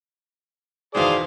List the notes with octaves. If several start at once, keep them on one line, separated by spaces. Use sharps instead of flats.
E2 B2 D#3 G#4 C5 D5 F5